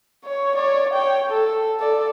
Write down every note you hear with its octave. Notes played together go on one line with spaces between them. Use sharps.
C#5
C#5 D5
C#5 G5
A4
A4 D5